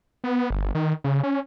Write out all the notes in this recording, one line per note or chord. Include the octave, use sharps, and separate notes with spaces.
B3
G1
D#3
C#3
C#4